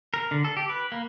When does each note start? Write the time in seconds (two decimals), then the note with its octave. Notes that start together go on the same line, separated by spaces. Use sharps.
0.14 A#4
0.31 D3
0.44 A4
0.57 G4
0.69 B4
0.92 A#3